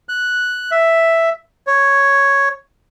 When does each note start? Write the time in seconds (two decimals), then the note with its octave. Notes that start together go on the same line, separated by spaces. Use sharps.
0.09 F#6
0.71 E5
1.67 C#5